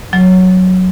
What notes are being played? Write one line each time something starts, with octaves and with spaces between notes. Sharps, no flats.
F#3